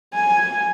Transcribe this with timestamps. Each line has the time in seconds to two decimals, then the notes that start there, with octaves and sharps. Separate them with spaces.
0.13 G#5